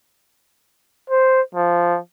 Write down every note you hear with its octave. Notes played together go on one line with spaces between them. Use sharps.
C5
F3